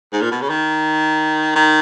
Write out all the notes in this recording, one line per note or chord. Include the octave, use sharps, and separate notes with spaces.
G#2
A#2
B2
C#3
D#3
D#3